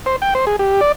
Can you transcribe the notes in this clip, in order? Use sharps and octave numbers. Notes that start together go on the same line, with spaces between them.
C5
G5
C5
G#4
G4
D5